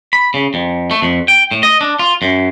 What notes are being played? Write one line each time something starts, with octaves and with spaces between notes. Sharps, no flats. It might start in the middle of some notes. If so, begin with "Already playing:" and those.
B5
C#3
F2
A3
F2
G5
A2
D#5
D4
F4
F#2